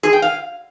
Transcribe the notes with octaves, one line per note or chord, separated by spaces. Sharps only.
G#4
G5
F5